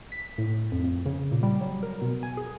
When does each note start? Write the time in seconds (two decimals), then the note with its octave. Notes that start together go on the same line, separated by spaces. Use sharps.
0.12 B6
0.38 A2
0.72 F2
0.84 F2
1.06 C#3
1.32 A#2
1.43 G3
1.61 F#3
1.83 A#4
2.02 B2
2.23 G#5
2.37 G#4